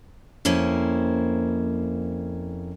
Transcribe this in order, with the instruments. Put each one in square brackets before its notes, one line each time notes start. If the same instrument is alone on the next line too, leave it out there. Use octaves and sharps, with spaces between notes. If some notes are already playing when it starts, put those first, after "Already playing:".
[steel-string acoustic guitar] F2 A#3 C#4 E4 C5